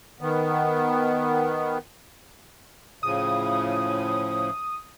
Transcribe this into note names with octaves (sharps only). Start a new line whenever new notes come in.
D#3 B3
A2 C#3 F3 D#6